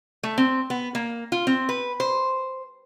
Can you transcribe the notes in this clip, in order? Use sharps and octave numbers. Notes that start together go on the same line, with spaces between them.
A3
C4
B3
A#3
F4
C4
B4
C5